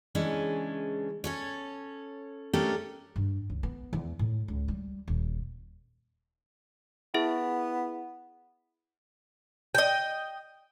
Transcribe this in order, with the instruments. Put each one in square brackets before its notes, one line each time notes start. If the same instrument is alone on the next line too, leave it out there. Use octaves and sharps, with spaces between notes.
[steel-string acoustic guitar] C#3 E3 G#3 C#4 D4
C#4 A4 C#5
A3 C#4 D4 G4 A4 A#4
[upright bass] G2
C#2
B3
E2
A2
C#2
G3
D#1
[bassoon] B3 [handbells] E4 G#4 E5
[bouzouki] D#5 G5